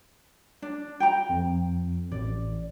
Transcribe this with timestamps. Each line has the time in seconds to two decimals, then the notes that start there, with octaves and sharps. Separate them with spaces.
0.62 D4
1.00 G5 A#5
1.30 F2
2.12 A1 D5